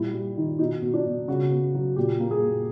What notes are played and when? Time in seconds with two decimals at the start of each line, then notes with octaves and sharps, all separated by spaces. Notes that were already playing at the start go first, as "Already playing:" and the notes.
Already playing: A#2 G3 E4
0.13 G3
0.37 D#3
0.59 B2 D#4
0.82 B2
0.94 D4
1.05 B2
1.28 C#3 F#4
1.51 B3
1.74 F#3
1.96 A#2 G4
2.20 A#3
2.31 G#4
2.43 A#2